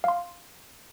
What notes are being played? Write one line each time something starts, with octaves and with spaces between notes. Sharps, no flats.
F5 C6